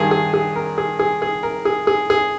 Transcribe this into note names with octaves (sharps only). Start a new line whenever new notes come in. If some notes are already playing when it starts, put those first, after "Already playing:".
Already playing: G2 D#3 G#4
G#4
G#4
A#4
G#4
G#4
G#4
A#4
G#4
G#4
G#4